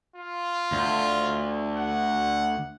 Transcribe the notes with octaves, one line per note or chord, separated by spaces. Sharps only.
F4
D2
F#5